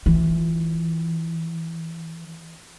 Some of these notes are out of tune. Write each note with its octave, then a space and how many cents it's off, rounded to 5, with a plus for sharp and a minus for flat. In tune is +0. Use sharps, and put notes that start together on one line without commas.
E3 +0 F4 +0